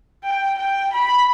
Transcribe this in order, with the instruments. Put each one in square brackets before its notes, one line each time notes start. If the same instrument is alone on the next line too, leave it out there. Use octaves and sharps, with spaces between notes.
[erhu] G5
G5
B5